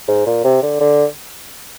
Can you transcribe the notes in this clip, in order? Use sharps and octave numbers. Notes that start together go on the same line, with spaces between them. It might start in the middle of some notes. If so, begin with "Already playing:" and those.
G#2
A#2
C3
D3
D3